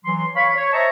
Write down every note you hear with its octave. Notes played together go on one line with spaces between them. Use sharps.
E3 F#3 C6
C#5 F5 B5 C#6
C#5
C5 D#5 E5 A5 A#5 C#6